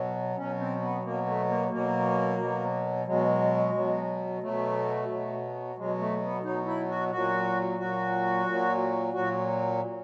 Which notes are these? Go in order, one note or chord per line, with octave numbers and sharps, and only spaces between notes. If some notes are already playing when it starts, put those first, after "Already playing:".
Already playing: B2 F#3
B2 F#3 C#4
C4
B3
B2 F#3 A#3
A3
A#3
B2 F#3 A#3
B2 F#3
B2 F#3 G#3
B2 F#3
B2 F#3 A3
B2 F#3
B2 F#3 G#3
A3
B3
B2 F#3 D#4
E4
F#4
A#2 F#3 F#4
A#2 F#3 F#4
A#2 F#3
A#2 F#3 F#4